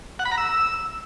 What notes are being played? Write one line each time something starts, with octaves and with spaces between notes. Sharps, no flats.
F#5
B5
A#5
E6